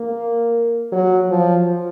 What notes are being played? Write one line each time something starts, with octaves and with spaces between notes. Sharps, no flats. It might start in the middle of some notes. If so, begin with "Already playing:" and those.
Already playing: A#3
F#3
F3